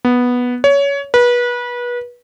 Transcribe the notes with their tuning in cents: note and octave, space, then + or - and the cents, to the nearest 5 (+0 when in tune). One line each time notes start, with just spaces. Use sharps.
B3 -5
C#5 +20
B4 -30